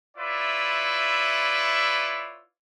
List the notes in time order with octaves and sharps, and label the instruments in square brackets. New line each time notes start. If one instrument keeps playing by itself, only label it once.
[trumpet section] E4 F4 B4 C#5 D5 E5